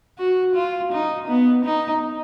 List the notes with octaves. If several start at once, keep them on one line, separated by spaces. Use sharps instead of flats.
F#4
F4
D#4
B3
D#4